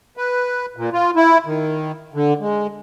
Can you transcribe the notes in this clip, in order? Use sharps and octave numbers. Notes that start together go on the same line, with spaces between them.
B4
A#2
F4
E4
D#3
D3
G#3